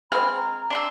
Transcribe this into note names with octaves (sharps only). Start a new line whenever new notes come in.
G#3 C4 B5 F6
A#5
D4 C6 E6